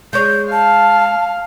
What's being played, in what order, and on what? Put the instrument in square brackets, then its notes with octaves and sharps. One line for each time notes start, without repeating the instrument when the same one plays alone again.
[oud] G#3 C#5 [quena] G6
[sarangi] F5 [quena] A5